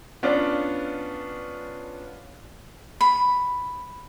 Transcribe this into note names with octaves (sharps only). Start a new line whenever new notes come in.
B3 C#4 D4 F4 D5
B5